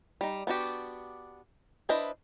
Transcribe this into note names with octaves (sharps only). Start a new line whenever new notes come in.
G3 D#4
B3 D4 F#4 G4
D4 E4 B4 C5 D#5